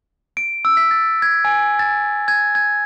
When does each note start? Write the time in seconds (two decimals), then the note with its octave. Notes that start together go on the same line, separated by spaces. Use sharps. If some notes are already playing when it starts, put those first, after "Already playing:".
0.37 D7
0.65 E6
0.77 B6
0.91 A6
1.22 G#6
1.45 G#5
1.79 A6
2.28 G#6
2.55 G#6